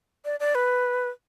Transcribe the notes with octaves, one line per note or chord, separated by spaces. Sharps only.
D5
D5
B4